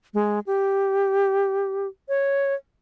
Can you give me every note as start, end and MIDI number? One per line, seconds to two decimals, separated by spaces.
0.14 0.39 56
0.47 1.87 67
2.09 2.54 73